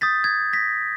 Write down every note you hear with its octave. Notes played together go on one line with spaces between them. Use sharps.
D#6 G6 A6 B6
G#6
A#6 B6